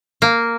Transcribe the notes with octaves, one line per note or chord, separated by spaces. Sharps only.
A#3